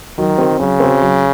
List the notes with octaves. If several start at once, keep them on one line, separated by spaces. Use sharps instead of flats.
D#3 F#3
C4 F#4
C#3 F#3
C4 F#4
F#3